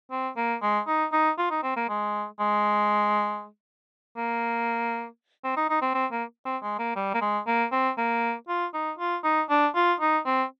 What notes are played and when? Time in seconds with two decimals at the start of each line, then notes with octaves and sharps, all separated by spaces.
0.11 C4
0.37 A#3
0.62 G#3
0.87 D#4
1.13 D#4
1.38 F4
1.51 D#4
1.63 C4
1.76 A#3
1.89 G#3
2.40 G#3
4.17 A#3
5.44 C4
5.57 D#4
5.70 D#4
5.82 C4
5.95 C4
6.12 A#3
6.45 C4
6.63 G#3
6.79 A#3
6.96 G3
7.14 A#3
7.21 G#3
7.47 A#3
7.72 C4
7.98 A#3
8.49 F4
8.74 D#4
8.99 F4
9.24 D#4
9.50 D4
9.75 F4
10.01 D#4
10.26 C4